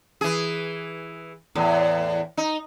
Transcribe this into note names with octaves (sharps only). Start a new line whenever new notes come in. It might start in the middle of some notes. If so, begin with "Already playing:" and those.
E3 G#4
E2 A2
D#4